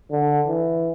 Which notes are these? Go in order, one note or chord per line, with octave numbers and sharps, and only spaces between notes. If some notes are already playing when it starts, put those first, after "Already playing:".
D3
E3